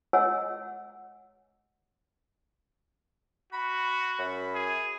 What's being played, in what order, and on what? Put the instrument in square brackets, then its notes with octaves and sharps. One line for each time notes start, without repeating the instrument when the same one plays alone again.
[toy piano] C#5 D#5 F#5 G#5 E6
[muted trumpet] F#4 [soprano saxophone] B5
[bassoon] F#2
[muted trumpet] G#4